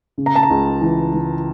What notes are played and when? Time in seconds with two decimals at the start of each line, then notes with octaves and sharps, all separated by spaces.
0.18 C#3
0.26 A#5
0.36 A5
0.43 A#5
0.50 C#2
0.82 E3
1.13 E3